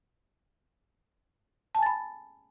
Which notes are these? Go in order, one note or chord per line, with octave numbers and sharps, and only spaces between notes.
G#5 A5 B5 A6